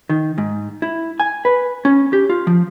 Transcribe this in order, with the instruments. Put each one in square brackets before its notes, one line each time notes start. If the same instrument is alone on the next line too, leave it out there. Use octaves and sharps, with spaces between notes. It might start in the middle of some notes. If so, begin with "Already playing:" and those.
[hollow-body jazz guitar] D#3
G#2
E4
G#5
B4
C#4
G4
F4
F3